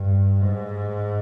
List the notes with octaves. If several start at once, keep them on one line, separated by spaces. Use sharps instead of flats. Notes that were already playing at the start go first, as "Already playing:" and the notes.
Already playing: G2
G#2